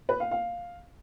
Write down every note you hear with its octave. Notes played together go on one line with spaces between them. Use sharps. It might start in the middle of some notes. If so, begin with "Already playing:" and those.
B4
F5
F5